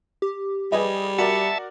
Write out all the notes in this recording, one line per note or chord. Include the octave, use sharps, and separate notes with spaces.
G4
G3 G#4 B4 D#5
F#4 A#4 D5 E5 A5 C#7